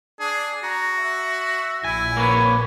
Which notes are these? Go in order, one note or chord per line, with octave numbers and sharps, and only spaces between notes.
D4 G#4
F#4 A#5
E5
A#1 E4 G#5
A#3 B4 C#5